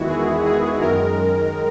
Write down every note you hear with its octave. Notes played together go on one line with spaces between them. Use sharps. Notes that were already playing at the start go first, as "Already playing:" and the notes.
Already playing: E2 D#3 G#3 B3 E4 F#4
G#4
G#4
F#2 D#3 G#3 A#4